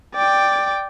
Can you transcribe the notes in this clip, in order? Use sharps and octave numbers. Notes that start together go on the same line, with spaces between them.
D5 G5